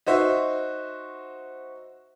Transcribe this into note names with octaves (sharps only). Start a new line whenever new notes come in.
D#4 F#4 C5 E5